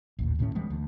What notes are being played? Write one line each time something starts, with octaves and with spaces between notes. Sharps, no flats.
A1 D#2 A#2
D2 A2 A#3 C#4
E3 G3 G#3 B3
D2